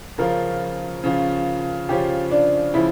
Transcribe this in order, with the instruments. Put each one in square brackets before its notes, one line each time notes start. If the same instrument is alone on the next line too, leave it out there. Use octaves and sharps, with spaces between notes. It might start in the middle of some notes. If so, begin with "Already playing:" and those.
[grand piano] C#3 F3 C#4 F4 [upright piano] A#4
[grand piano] C#3 F3 C#4 F4
[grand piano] C#3 F3 C#4 F4 [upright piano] G4
[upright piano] D4
[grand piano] C#3 F3 [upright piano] E4